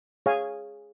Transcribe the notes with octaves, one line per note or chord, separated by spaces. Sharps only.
G#4 C#5 F5 G#5